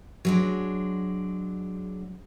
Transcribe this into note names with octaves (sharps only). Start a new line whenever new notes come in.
F#3 G#3 D4